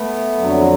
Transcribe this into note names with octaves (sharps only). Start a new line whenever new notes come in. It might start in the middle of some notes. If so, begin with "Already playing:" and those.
Already playing: A3 B3
F2 D3 F#3